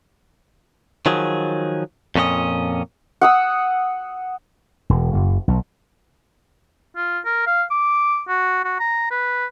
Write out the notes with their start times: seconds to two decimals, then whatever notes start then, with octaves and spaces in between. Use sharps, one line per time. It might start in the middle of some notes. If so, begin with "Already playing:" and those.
1.06 D#3 F3 F#3 G#4
2.15 F2 A#2 C#4 F#4 D#5
3.21 F#5 D#6 E6
4.90 E1
5.14 F#1
5.48 B1
6.97 F4
7.25 A#4
7.47 F5
7.71 D6
8.29 F#4
8.65 F#4
8.80 A#5
9.11 B4